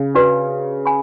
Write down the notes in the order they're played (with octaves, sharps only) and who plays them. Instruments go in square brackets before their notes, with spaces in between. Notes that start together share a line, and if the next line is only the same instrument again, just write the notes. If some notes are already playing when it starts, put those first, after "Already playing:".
Already playing: [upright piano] C#3
[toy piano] D4 F#4 B4 D5
G#5 B5